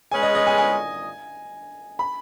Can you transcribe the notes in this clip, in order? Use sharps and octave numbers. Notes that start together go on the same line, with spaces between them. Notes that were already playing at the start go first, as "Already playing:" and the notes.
G#3 C#4 G#4 B4 G#5
D#5
D#5
G#5
G#5
B5